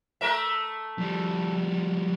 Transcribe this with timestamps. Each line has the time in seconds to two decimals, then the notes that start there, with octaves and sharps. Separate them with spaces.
0.21 A3 A#4 E5
0.98 F3 G3